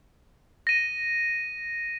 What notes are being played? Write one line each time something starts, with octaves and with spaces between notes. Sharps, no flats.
A#6 D#7